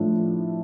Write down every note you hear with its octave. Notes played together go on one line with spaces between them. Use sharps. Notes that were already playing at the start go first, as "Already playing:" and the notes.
Already playing: A2 F3 A3 D4